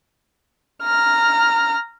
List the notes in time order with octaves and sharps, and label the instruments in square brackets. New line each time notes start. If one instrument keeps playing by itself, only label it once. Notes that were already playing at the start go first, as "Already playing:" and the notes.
[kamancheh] A#5 F6